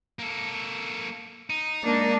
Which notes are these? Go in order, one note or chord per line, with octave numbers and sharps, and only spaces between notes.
A#3 A4
D#4
G#3 A#3 D4